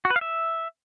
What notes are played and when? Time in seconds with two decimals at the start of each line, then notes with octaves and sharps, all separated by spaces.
0.05 F#4
0.10 B4
0.16 F5
0.21 E5